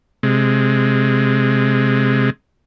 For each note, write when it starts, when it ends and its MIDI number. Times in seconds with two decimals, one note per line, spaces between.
0.23 2.30 48
0.23 2.30 56